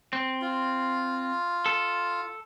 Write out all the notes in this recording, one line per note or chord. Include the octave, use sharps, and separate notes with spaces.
C4
F4
A4